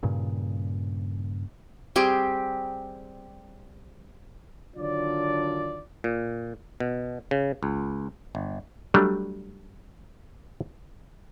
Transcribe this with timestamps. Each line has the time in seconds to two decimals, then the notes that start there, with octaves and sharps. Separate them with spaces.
0.03 G2 A#2 C#3
1.96 G3 C4 G4 G#4
4.76 D3 D#3 F#3 D4 F4 D5
6.04 A#2
6.80 B2
7.31 C#3
7.63 C#2
8.35 G1
8.94 F#3 G3 A3 D4